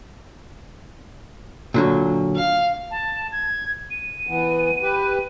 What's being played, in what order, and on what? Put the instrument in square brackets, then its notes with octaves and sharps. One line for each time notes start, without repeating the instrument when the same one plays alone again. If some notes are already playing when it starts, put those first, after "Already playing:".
[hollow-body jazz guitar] A#2 D3 F#3
[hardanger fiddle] F5
[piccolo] A5
G#6
D#7
[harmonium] E3 B3
G4 B4